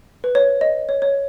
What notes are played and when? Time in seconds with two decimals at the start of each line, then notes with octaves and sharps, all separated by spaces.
0.24 B4
0.35 C#5
0.61 D#5
0.89 C#5
1.02 C#5